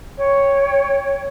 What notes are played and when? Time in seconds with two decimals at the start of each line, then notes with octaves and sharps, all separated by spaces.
0.16 C#5 G5